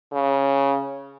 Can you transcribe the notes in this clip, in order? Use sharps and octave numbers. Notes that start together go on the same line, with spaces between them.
C#3